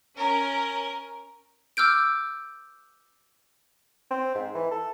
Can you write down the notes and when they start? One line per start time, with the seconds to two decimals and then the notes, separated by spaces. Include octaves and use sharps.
0.17 C#4 A#4
1.77 D6 E6 F6 G6 D7
4.11 C4
4.35 G#2
4.55 E3
4.71 A4